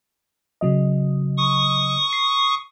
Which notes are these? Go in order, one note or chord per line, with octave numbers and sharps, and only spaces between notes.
C#3 F#3 D#5
C#6 D#6
C7